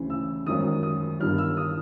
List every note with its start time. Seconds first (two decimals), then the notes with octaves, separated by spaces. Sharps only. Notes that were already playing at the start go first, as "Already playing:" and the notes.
Already playing: D2 C#3 E3
0.10 E6
0.46 G#1 F#2 D#3 D#6
0.83 D#6
1.20 G1 G2 D#3 F6
1.38 E6
1.57 D#6